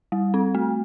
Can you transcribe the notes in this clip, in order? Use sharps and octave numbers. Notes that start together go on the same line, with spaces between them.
G3
C4
A3